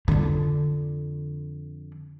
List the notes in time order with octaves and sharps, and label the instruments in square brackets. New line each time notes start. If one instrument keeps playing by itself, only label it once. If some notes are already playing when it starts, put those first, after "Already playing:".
[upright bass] F2 D3